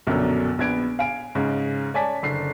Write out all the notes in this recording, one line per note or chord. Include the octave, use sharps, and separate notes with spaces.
A#1 F#2 B2 D3 F#3
A#1 B3 G#6 D7
F5 G#5 D7
G#2 C#3
C#5 D5 G#5 A5 B6
F#1 D3 C7